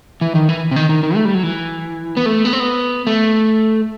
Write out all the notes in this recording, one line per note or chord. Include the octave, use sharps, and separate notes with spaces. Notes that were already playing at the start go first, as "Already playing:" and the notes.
E3
D#3
E3
C3
D#3
D#3
D#3
A3
G3
F#3
E3
B3
A3
B3
C4
B3
A3